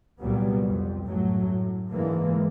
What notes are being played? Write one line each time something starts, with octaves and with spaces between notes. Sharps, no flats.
C2 A#2 F#3 G3 B3
F2
F#2 A2 F#3 A3
A2
G#2 D3 E3 G#3 A#3